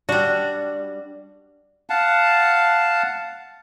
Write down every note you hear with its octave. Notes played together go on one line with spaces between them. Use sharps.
G3 D4 F#4
F5 F#5 A5